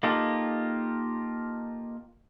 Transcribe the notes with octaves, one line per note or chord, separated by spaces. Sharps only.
A#3 D#4 F4 G4 A4